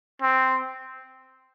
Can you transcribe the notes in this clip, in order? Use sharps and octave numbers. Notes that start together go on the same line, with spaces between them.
C4